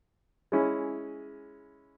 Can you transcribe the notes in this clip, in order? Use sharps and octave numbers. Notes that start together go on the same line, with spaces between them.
G#3 C#4 E4